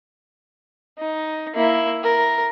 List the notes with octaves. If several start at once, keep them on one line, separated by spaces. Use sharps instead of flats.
D#4
A#3 E4
A#4